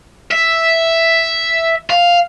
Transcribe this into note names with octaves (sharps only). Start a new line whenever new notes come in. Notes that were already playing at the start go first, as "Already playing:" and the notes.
E5
F5